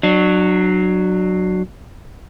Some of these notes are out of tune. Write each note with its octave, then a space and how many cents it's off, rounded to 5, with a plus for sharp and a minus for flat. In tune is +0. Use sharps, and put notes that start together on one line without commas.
F#3 +0 D4 +35